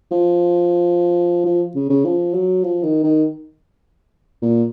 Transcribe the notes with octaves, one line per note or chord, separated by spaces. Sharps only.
F3
F3
C#3
C#3
F3
F#3
F3
D#3
D#3
A#2